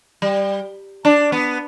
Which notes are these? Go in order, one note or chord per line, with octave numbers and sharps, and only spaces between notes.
G3
D4
B3